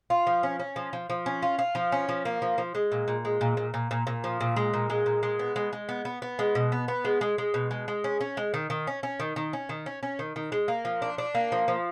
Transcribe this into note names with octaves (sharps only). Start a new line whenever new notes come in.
F4
F3
C#4
C#4
F3
F3
F3
C#4
F4
F4
F3
C#4
F3
A#3
F3
F3
G#3
A#2
A#2
G#3
A#2
A#2
A#2
A#2
A#2
F3
A#2
G#3
A#2
G#3
A#2
G#3
B3
G#3
G#3
B3
B3
B3
G#3
B2
B3
B3
G#3
G#3
G#3
B2
G#3
G#3
C#4
C#4
G#3
D#3
D#3
C#4
C#4
D#3
D#3
C#4
D#3
C#4
C#4
D#3
D#3
G#3
A#3
F3
D4
D4
A#3
F3
F3